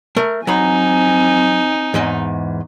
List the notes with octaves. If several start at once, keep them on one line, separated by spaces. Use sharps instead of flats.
A3 A#4
F#3 C4 D#4 G#5 A#5 B5
E2 G#2 D#5